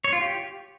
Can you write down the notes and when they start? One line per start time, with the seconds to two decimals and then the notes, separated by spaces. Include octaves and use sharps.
0.04 C#5
0.13 F4
0.21 G4